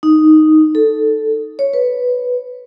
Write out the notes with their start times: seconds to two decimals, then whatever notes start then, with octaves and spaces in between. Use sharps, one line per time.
0.03 D#4
0.75 A4
1.59 C#5
1.74 B4